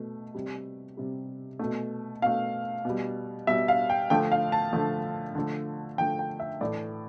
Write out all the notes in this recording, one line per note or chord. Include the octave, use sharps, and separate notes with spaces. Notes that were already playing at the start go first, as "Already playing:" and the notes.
Already playing: B2 A3
C3 G3
C3 G3
B2 A3
B2 A3 F5
B2 G3
B2 G3 E5
F5
G5
D3 F3 A3 G5
F5
A5
D3 F3 A3
D3 F3 A3
D3 F3 A3 G5
G5
E5
A2 E3 A3 D5